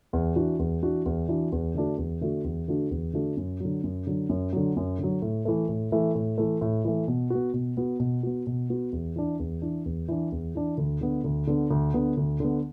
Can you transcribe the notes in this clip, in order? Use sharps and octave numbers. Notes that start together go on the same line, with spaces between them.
E2
E3 D4 F#4
E2
E3 D4 F#4
E2
E3 D4 F#4
E2
D3 A3 D4 F#4
E2
D3 A3 D4 F#4
E2
D3 A3 D4 F#4
E2
D3 A3 D4 F#4
F#2
D3 F#3
F#2
D3 F#3
F#2
D3 F#3
F#2
D3 F#3
A2
E3 A3
A2
E3 A3
A2
E3 A3
A2
E3 A3
B2
B3 F#4
B2
B3 F#4
B2
B3 F#4
B2
B3 F#4
E2
E3 D4
E2
E3 D4
E2
E3 D4
E2
E3 D4
D2
D3 B3
D2
D3 B3
D2
D3 B3
D2
D3 B3